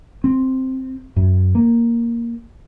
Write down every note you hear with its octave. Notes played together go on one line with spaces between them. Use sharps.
C4
F#2
A#3